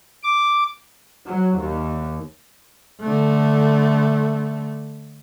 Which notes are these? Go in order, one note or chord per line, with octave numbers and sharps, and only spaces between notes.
D6
F#3
D#2
D3 A3